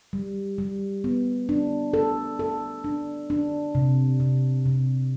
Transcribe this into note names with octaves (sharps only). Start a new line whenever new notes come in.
G3
G3
B3
D4
A4
A4
D4
D4
C3
C3
C3